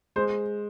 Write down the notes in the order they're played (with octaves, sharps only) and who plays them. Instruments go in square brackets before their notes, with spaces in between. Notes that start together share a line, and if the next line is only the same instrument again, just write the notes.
[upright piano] G#3 C5